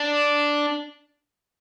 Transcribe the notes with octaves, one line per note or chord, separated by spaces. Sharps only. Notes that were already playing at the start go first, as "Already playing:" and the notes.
Already playing: D4